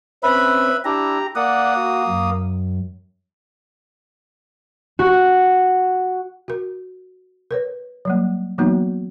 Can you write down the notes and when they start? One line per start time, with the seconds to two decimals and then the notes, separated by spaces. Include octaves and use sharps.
0.23 C4 C#4 B4 E5 B5
0.85 D4 E4 G4 A#5
1.36 A#3 D5 F#5 D#6
1.75 F#4
2.08 F#2
4.99 F#4
6.48 F#4 A#4
7.51 A#4 B4 C#5
8.05 F#3 G3 A#3
8.58 E3 F#3 A#3 B3 D#4 F#4